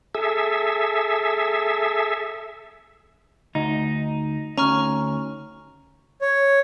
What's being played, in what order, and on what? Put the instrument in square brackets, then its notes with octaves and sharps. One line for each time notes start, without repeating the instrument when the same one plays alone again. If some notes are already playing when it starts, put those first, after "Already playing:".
[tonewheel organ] G#4 A4 E5
[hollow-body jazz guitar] D2 [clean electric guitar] D#4
[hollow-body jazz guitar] D2 C#4 [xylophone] A#5 C#6 F6
[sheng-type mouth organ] C#5